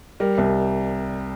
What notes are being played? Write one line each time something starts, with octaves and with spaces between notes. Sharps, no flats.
G3 A#4
C2